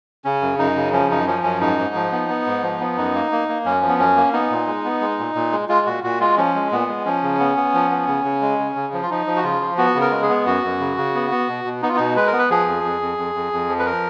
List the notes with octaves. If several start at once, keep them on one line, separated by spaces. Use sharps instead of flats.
C#3 C#4
F#2
F#2 D#4
C#3
F3 C#4
F#2 D#4
F3 C#4
F#2 C#4
G#2 D#4
G#2
F3
B3
B3
G#2
F3
B3
F#2 D#4
A#3
A#3
A#3
F#2 C#4
F3
B3
F#2 C#4
A#3
B3 D#4
A#2
G#3
B3
G#3
A#2
A#2
G#3
G#3 F4
A#2 F#4
A#2 F#4
G#3 F4
F3 C#4
G#3
A#2 B3
G#3
F3 C#4
C#3
B3
B3
F3
B3
C#3
C#3
G#3
C#3
C#3
F3
F4
F3 D#4
F3
F#4
C#3 F4
F3
B3 F#4
C#3
A#4
G#3
G#4
B3
F#2 F#4
F#2
C#3
C#3
B3
B3
B2
B2
B3 D#4
F4
B2 D#4
G#3 B4
A#4
B3
B4
F3 G#4
F2
F2
F2
F2
F2
F2
F3
B4
A#4